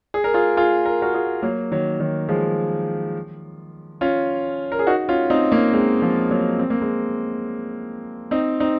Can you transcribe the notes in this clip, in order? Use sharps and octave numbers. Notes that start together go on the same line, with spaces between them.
G#4
A#4
F4 G#4
F4 G#4
A#4
F#4 A#4
F4 G#4
F#3 A#3
D#3 F#3
D#3 F#3
F3 G#3
C#4 F4
A#4
G#4
D#4 F#4
C#4 F4
C4 D#4
A#3 C#4
G#3 C4
F3 G#3
F#3 A#3
C4
A#3
G#3 C4
C4 D#4
C4 D#4